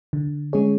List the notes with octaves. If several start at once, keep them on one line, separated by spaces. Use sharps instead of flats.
D3
G#3 C#4 G#4 C#5